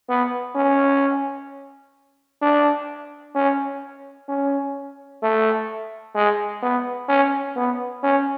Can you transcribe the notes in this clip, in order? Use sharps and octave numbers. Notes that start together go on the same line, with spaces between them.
B3
C#4
D4
C#4
C#4
A3
G#3
B3
C#4
B3
C#4